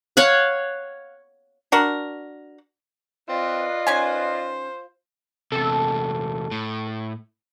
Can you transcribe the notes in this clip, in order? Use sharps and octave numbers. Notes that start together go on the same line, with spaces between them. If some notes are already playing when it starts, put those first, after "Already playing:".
C#5 F5 F#5
D4 F#4 A#4
C4 F4 B4 D5 D#5
D#3 C#4 C5 G#5
E2 C3 A4
A2